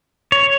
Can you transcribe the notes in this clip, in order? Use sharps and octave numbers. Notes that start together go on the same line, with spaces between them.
C#5